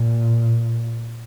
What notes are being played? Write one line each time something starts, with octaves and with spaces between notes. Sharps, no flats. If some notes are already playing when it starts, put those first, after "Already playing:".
Already playing: A#2